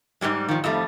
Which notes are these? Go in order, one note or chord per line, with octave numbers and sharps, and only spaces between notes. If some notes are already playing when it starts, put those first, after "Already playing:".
G#2 C#3 G3 G#3
D#3 F3
F2 F3 G3 A3